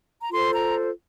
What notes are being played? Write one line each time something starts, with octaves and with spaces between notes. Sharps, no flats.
A#5
F4 A4 C5 C6
A#5